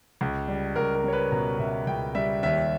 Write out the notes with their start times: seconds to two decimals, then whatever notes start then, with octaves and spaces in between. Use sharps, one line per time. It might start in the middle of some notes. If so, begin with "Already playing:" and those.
0.21 C#2
0.48 G3
0.76 C#2 A#4
0.95 A#4
1.04 G3 C#5
1.13 B4
1.32 B2 A#5
1.59 B2 E5
1.87 C#2 G5
2.15 G3 E5
2.43 D#2 E5